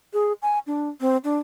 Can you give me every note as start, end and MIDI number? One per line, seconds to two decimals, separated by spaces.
0.13 0.33 68
0.42 0.59 80
0.67 0.89 62
1.01 1.17 60
1.24 1.38 62